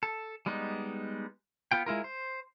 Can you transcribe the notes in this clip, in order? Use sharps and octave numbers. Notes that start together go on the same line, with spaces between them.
A4
G3 G#3 B3 D#4
B3 F4 G5
G#3 E4 F4 A#4
C5